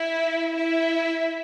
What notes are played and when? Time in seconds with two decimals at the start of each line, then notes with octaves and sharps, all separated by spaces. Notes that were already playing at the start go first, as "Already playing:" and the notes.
Already playing: E4 E5
0.56 E4 E5